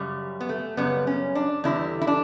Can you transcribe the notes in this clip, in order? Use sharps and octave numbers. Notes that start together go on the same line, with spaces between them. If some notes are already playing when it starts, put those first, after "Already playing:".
Already playing: F#2 C#3 G3
B3
A3
F#2 C#3 G3 B3
C#4
D4
E2 D3 G3 E4
E4
D4